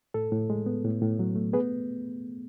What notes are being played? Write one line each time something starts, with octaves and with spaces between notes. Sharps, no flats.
A2 A4
A2
G#3
B3
A2
A2
F#3
A3
B3 G#4 B4